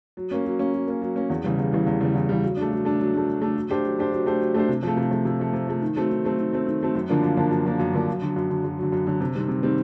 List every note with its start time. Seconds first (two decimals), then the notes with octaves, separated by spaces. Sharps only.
0.17 F#3
0.31 A#3 C#4
0.45 F#3
0.59 A#3 C#4
0.73 F#3
0.87 A#3 C#4
1.02 F#3
1.16 A#3 C#4
1.30 E2
1.44 C#3 E3 G3
1.58 E2
1.72 C#3 E3 G3
1.86 E2
2.01 C#3 E3 G3
2.15 E2
2.29 C#3 E3 G3
2.43 F#3
2.57 A3 D4
2.71 F#3
2.85 A3 D4
2.99 F#3
3.14 A3 D4
3.28 F#3
3.42 A3 D4
3.56 F#3
3.70 A3 D4 G4 C5
3.84 F#3
3.98 A3 D4 G4 C5
4.12 F#3
4.26 A3 D4 G4 C5
4.40 F#3
4.54 A3 D4 G4 C5
4.69 C3
4.83 F3 A3
4.97 C3
5.11 F3 A3
5.25 C3
5.39 F3 A3
5.53 C3
5.67 F3 A3
5.82 D#3
5.96 F#3 A3 C4
6.10 D#3
6.24 F#3 A3 C4
6.38 D#3
6.52 F#3 A3 C4
6.66 D#3
6.80 F#3 A3 C4
6.95 F#2
7.09 D3 F3 A#3 D4
7.23 F#2
7.37 D3 F3 A#3 D4
7.51 F#2
7.65 D3 F3 A#3 D4
7.79 F#2
7.94 D3 F3 A#3 D4
8.08 F#2
8.22 D3 F#3
8.36 F#2
8.50 D3 F#3
8.64 F#2
8.78 D3 F#3
8.92 F#2
9.07 D3 F#3
9.21 C3
9.35 D#3 G3 C4
9.49 C3
9.63 D#3 G3 C4